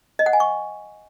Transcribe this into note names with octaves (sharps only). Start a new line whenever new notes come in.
D#5
F#5
G#5
C#6